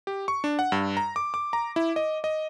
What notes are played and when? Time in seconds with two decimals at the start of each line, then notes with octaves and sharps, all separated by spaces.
0.07 G4
0.28 C#6
0.44 D4
0.59 F#5
0.72 G2
0.97 A#5
1.16 D6
1.34 D6
1.53 A#5
1.76 E4
1.96 D#5
2.24 D#5